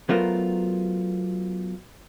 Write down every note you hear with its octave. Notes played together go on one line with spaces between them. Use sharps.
F#3 A3 B3 F4 A#4 C5